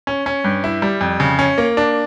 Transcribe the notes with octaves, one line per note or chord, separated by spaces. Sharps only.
C#4
C#4
G2
E4
G3
F2
C#3
C#4
A#3
D4